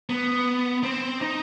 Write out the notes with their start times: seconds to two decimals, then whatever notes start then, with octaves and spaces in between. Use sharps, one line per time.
0.10 B3
0.83 C4
1.21 D#4